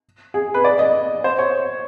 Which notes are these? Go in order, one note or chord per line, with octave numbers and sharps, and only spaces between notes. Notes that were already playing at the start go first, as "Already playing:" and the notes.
G#4
B4
D5
D#5
C5
C#5